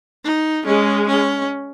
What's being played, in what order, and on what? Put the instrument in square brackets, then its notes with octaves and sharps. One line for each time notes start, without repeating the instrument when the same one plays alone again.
[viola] D#4
[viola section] G#3 [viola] C#4
[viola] C#4